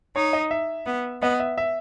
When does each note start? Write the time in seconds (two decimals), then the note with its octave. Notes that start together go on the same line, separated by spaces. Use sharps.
0.16 D#4 C#5
0.33 D#5
0.51 E5
0.86 B3
1.22 B3 D#5
1.40 E5
1.58 E5